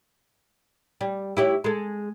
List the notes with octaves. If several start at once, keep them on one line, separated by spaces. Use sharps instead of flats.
G3
E4 G4 C#5
G#3 A4